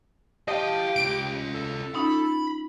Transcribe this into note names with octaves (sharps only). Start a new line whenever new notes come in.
G4 D#5 F5 A5
C#4 F4 D7
A4
C#4 D#4 F4 B5